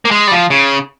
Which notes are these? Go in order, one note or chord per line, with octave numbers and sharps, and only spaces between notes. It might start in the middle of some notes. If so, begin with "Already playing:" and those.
A#3
G#3
G3
F3
C#3